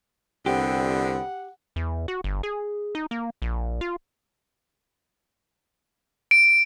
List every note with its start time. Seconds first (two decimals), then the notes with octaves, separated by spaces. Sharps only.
0.46 C2 D3 B3 C4 G4 F#5
1.76 E2
2.08 F#4
2.24 G1
2.43 G#4
2.95 D#4
3.11 A#3
3.42 A#1
3.81 F4
6.31 D7